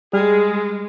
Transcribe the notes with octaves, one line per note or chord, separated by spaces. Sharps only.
G3 G#3 G#4 F6